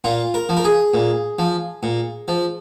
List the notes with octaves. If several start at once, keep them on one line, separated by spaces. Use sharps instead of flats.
A#2 F4
A#4
F3
A#4
G#4
A#2
F3
A#2
F3